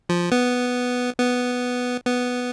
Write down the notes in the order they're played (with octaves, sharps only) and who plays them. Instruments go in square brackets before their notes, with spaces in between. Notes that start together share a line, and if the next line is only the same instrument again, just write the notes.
[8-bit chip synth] F3
B3
B3
B3